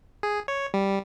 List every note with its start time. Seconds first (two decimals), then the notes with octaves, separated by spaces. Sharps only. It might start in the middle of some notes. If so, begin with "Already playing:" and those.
0.23 G#4
0.48 C#5
0.74 G3